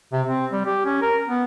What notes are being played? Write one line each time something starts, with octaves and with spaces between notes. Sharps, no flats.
C3
C4
G3
G4
C#4
A#4
B3